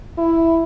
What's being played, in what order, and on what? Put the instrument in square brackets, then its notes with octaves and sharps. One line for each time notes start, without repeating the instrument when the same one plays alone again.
[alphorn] E4